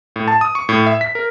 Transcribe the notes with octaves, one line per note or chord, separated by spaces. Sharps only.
A2
A5
D#6
C#6
A2
E5
B6
A#4